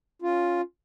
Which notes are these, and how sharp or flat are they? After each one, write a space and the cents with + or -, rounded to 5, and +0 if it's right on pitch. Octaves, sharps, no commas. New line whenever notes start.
C#4 +0 F4 +0